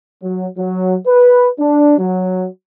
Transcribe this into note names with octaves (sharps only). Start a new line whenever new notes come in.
F#3
F#3
B4
D4
F#3